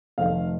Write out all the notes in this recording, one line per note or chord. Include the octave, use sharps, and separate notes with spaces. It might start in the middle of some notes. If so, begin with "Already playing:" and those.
F1 F2 C3 D#3 A3 F5